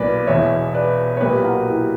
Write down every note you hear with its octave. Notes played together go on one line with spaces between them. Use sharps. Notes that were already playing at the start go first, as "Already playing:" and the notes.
Already playing: B1 A#2 A#3 B4 D5
E1 E2 B2 C#5 E5
B4 D5
C#5
B1 A#2 A#3 G4 B4
F#4 A#4
E4 G4